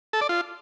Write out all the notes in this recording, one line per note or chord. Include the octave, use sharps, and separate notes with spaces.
A4
D5
F4